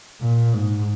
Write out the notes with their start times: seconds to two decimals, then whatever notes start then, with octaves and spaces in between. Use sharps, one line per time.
0.21 A#2
0.53 G#2